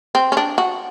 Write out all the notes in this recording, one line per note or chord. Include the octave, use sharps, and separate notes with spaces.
C4
C#4
D4
F#4